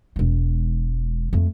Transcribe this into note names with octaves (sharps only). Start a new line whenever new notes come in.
E1 G#3
F2 A3